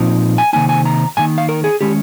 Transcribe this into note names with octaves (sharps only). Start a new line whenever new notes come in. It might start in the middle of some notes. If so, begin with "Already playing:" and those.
Already playing: A#2 F3 C4 D#4
G#5
C3 D#3 A#3 D#4 G#5
G#5
A#5
G#2 D#3 A#3 G#5
F5
A#4
G#4
D#3 G#3 C#4 G4